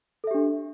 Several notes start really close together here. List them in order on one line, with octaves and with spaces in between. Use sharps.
A4 E5 G4 D4